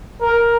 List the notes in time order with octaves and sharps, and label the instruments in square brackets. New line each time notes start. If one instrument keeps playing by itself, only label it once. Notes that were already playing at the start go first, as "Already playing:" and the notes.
[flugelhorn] A#4